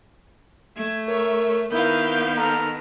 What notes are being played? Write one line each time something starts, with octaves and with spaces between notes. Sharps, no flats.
A3 G#6
A#4 C#5 E5
D#3 B3 E4 A#4 F5 G6
A4 A#5 F6